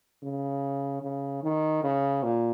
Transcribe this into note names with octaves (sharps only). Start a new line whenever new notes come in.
C#3
C#3
D#3
C#3
A#2